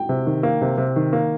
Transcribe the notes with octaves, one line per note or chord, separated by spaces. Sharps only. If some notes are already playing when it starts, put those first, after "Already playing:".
Already playing: G5
C3
D#3
A#3
C3
C3
D#3
A#3